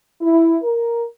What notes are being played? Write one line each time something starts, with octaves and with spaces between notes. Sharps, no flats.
E4
A#4